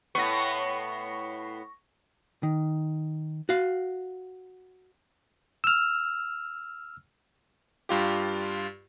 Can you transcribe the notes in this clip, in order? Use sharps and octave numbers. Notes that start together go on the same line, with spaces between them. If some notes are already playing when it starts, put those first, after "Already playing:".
A2 B3 C#6 A#6
D#3
F#4 F5
E6 F6
G2 F4 G4